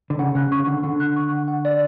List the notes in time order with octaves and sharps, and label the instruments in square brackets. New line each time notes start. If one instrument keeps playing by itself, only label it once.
[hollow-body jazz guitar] D3
[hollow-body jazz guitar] C#3 [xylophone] F#5
[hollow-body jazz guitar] C#3 [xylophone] F#6
[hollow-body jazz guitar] C#3 [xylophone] C#6
[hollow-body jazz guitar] D3 [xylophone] F#5
[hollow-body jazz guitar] D3 [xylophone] F#5
[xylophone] F#6
C#6
F#5
F#5
D5